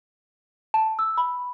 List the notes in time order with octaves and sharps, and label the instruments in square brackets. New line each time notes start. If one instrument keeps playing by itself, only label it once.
[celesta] A5
E6
B5